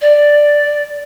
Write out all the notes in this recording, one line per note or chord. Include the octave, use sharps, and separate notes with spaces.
D5